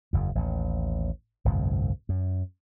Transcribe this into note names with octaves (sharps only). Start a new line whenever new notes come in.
F#1 E2
A1 D#2
G1 C2 F2 A2
F#2